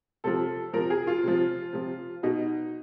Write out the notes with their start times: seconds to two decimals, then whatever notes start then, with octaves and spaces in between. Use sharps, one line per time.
0.24 C3 F3 A4
0.73 C3 F3 A#4
0.90 G#4
1.07 F4
1.23 C3 F3
1.73 C3 F3
2.23 B2 D#4